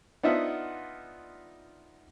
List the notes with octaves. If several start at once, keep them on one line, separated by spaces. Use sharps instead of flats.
B3 D4 D#4 F4 E5 F#5